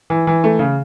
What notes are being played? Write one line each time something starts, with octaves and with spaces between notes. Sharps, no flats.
E3
E3
A3
C#3